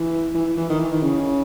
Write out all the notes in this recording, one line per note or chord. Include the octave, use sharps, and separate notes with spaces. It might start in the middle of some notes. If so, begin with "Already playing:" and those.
Already playing: E3
E3
E3
D#3
E3
D#3
C#3